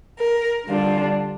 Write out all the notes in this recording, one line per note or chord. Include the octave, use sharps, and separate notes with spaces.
A#4
D3 G3 D4 F4